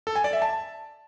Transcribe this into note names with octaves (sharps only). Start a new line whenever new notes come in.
A4
G#5
D5
E5
A5